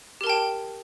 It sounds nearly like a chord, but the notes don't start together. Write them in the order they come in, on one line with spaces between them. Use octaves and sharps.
G4 A#4 A5 G5